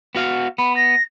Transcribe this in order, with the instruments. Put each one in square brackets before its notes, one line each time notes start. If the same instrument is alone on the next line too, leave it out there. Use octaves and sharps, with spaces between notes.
[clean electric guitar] B3 F#4 F5
[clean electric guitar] B3 [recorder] B5
[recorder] A#6